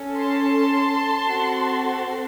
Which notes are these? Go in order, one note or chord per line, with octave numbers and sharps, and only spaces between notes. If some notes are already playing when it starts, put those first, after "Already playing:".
Already playing: C#4 A4
A5 C6
C4 F#4 A4